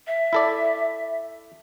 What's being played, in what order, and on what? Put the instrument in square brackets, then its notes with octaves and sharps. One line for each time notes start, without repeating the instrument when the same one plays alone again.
[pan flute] E5
[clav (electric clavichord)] E4 A4 D5